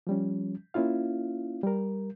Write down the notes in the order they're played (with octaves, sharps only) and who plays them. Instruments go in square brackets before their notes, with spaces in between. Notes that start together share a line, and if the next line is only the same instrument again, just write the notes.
[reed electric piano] F3 G3 C#4
A#3 C#4 E4 F4 F5
G3 A#4